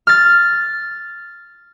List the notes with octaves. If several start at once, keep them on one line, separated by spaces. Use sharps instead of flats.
F6 A6